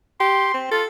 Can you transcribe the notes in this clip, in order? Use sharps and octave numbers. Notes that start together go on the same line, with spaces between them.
G4 C6
C4
F4 A4